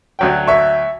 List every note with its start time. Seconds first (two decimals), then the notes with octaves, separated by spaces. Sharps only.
0.19 D2 F#3 G5
0.47 E5 C#6